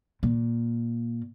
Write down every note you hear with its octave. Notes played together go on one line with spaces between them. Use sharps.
A#2